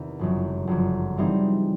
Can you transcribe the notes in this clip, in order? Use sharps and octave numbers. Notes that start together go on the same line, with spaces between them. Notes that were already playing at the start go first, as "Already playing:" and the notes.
Already playing: E2 C3 D#3
G1 F#2 C#3 F3
G1 F#2 C#3 F3
E3 G3 C4 D#4 G#4